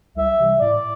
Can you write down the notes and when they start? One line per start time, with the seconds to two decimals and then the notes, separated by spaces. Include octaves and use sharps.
0.16 C2 E5
0.38 C3 E3 G3
0.59 A2 D5